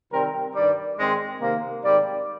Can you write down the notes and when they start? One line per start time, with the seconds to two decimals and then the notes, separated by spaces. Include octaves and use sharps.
0.12 C3 D#3 G3 C4 A#4
0.55 G2 D#3 G3 D5
0.98 G#2 D#3 G#3 C4
1.41 C3 D#3 A#3
1.84 G#2 D#3 G3 C4 D5